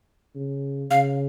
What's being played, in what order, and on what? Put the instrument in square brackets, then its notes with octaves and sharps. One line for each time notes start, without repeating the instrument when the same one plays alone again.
[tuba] C#3
[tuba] C#3 [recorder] F5